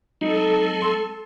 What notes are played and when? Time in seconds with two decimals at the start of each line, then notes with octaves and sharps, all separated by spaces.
0.21 F#3 G#3 C4 D#4 A4
0.82 C6